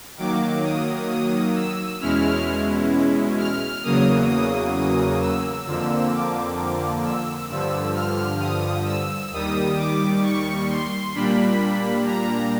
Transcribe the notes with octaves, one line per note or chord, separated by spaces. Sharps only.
D#3 F#3 A#3 D6
D#6
D#6
E6
E2 B2 G#3 C#4 E4 F6
F6
E2 C#3 F#3 A#3 D#6
D#6
D#6
E6
F2 D3 F3 A#3 E6
D6
E6
G2 D3 F3 E6
F6
D#6
E6
D#2 D#3 G3 D#6
D6
C#6
C6
A#2 G3 A#3 D4 B5
A#5